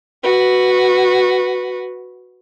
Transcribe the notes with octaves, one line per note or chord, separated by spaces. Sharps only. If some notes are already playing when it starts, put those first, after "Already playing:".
F#4 B4